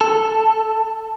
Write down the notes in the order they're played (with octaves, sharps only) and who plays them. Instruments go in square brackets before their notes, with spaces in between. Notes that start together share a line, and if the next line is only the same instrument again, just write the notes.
[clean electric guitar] A4